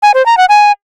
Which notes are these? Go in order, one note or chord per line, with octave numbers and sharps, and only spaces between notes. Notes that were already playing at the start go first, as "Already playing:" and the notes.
G#5
C5
A#5
F#5
G#5